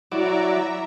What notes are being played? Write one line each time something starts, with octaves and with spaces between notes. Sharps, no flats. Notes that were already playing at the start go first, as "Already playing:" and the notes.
F#3 E4 D5 E5 A#5